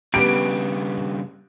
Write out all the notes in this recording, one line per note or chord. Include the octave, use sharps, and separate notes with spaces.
G2 C#3 B3 G4 D7